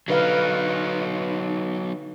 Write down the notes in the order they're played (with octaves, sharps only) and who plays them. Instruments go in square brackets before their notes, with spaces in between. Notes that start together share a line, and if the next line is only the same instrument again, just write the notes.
[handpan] D3 B4 F5 [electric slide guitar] F#3 D#4